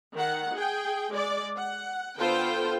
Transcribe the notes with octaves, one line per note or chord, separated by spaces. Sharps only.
D#3 F#5
G#4 G5
G#3 D5
F#5
D3 B3 F4 A4 C5 G5